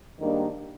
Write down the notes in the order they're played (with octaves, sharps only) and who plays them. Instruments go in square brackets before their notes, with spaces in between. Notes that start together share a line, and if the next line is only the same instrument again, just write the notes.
[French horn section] G#2 D#3 G3 A#3 D4